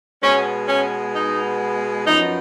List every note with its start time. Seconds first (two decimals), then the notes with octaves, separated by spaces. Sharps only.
0.23 B2 G#3 B3 C#4
0.69 C#4
1.15 D#4
2.07 F#2 F3 B3 D#4